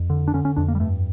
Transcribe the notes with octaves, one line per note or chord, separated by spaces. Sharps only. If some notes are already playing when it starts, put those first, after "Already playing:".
Already playing: F2
D3
D4
D3 C#4
C#4
F2 D4
A#3
G3
G2 A3